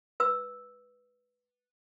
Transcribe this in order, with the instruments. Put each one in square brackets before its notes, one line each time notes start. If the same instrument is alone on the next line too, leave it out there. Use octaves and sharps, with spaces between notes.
[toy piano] B4 E6